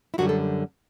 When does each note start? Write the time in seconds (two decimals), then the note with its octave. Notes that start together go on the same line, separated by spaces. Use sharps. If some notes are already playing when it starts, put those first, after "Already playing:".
0.14 E4
0.18 F#2 D3 G3 F#4
0.29 A4